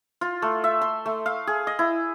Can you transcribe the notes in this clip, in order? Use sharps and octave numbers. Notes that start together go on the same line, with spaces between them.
F4
A3
E5
C6
A3
F5
G#4
D#5
E4